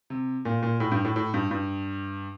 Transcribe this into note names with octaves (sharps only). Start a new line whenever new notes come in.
C3
A#2
A#2
A2
G2
A2
A2
G2
G2